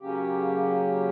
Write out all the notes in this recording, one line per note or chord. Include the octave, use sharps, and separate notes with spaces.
C#3 F#3 A#3 C#4 G4